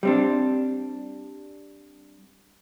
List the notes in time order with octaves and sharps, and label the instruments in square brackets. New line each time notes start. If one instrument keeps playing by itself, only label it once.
[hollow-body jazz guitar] G3 C4 D4